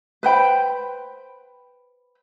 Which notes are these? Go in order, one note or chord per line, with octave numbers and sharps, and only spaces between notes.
B4 C5 G5 B5